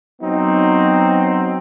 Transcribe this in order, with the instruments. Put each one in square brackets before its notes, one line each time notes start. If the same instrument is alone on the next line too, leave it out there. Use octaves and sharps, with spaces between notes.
[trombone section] F#3 B3 C4 D#4